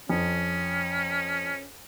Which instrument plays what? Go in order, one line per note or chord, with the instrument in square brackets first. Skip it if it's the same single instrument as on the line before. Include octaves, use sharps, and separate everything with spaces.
[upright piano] F2 [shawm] C#4